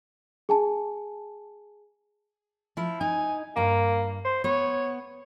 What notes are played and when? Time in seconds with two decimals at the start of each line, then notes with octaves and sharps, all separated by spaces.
0.49 G#4 G#5 A5
2.77 F3 E4
3.01 D#4 G#5
3.56 G2 A#3 A#5
4.25 C5
4.44 B3 C#5